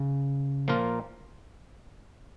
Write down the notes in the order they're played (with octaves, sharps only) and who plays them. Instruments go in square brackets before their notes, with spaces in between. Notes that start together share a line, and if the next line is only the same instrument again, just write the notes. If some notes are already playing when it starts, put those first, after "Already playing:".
Already playing: [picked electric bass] C#3
[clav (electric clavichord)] A#2 F3 A#3 F4 A#4